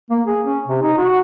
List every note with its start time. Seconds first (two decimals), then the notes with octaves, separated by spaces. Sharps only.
0.11 A#3
0.26 G#4
0.46 C#4
0.68 C3
0.82 D#4
0.98 F#4